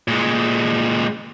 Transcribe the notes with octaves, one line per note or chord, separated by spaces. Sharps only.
A#2 G#3